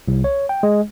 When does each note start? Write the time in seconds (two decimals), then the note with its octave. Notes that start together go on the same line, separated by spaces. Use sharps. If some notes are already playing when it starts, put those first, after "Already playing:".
0.08 C2
0.24 C#5
0.49 G5
0.63 G#3